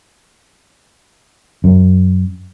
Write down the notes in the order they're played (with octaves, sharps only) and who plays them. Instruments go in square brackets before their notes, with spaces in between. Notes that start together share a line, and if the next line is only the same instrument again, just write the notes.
[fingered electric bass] F#2